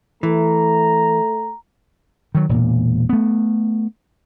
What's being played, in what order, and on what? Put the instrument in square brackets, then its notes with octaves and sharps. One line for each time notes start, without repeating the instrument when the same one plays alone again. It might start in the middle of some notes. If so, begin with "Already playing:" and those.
[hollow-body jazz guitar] E3 [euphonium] A3 [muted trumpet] A#5
[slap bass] D#3 F#3
E1 A#2
A3 B3